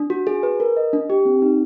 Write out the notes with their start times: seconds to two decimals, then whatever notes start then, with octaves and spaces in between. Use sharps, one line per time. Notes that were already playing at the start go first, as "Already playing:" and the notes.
Already playing: D4
0.10 F#4
0.27 G#4
0.43 B4
0.60 A#4
0.77 D#5
0.93 D4
1.10 G4
1.25 C4
1.42 D#4